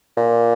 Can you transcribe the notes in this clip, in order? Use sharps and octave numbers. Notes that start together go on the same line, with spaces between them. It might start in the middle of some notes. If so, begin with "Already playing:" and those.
A#2